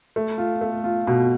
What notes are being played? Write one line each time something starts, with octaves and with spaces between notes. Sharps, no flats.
A3
F4
A3
F4
B2